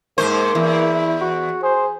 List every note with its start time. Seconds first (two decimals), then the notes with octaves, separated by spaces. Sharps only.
0.18 G#2 F3 A#3 C5
0.55 E2 E4
1.21 F#4
1.63 G#4 C5